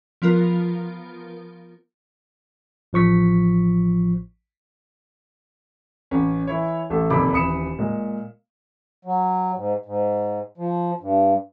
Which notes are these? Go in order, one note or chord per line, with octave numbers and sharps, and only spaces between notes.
F3 B3 F4 A#4
A1 F3 C#6 B6
A1 C#4
E3 E4 C#5
A1 A3 A4
F1 D#2 A#2 A4 B5 D6
D#1 E3 B5 D#6 C#7 E7
A#2 G#3
F#3
G#2
G#2
F3
G2